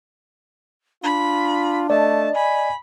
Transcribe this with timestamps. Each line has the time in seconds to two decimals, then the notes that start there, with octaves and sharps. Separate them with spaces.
1.03 D4 F4 B5
1.90 A3 D5 D#5 A5
2.35 G#5 B5